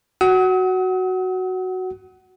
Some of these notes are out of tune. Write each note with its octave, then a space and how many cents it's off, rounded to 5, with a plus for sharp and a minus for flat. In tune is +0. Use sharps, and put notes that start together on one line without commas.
F#4 +0 F#5 +20 D#6 +45